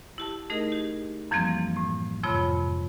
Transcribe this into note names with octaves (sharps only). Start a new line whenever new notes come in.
E4 G4 A5
A3 D#4 G#4 A#4 D#5
G4
F#2 E3 F3 G3 A#3 C4
A2
F2 G#2 C3 F4 C#5 B5